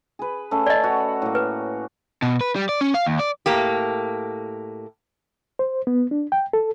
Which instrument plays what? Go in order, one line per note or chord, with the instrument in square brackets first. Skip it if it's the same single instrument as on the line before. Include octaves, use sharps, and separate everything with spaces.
[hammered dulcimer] G#4 B4
A3 C#4 A4
[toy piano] D5 D#5
[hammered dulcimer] F#4 C#5 F#5
A2 A#3
[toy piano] B4
[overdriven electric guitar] B2
B4
G3
D5
C#4
F5
D#2
D5
[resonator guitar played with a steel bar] A2 A#3 G4
[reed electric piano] C5
B3
D4
G5
A4